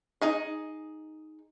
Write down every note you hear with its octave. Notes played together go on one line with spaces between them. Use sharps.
D#4 G#4 D#5